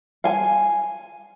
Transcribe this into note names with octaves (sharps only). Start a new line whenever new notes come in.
F5 G#5